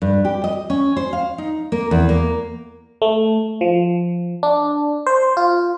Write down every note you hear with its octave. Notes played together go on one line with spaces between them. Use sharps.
G2
G4
D#5
C#4
C5
F5
D#4
A#3
E2
A#3
A3
F3
D4
C5
F4